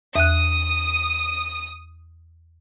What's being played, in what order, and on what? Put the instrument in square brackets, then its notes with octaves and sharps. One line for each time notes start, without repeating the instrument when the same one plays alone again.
[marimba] E2 F#6 [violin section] D#6